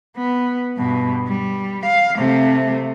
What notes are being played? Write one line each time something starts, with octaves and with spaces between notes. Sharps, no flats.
B3
G2 B2
G3
F5
C3 A3